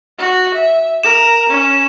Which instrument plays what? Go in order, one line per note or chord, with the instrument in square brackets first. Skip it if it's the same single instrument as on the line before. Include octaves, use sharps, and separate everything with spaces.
[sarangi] F#4
E5
[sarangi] A#4 [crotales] E7
[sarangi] C#4